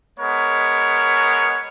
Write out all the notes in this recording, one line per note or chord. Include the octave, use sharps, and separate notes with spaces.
G#3 B3 A#4 C#5